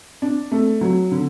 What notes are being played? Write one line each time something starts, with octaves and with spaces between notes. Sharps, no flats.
D4
A3
F#3
D3